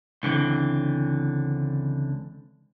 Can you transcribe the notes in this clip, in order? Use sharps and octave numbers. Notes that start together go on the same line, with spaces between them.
C#2 D3 E3 C4